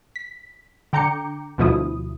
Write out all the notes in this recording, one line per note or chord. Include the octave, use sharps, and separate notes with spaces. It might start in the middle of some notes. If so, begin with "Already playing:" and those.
B6
D3 G5 A#5 D6 G6 C#7
D2 B2 F3 E4 D#6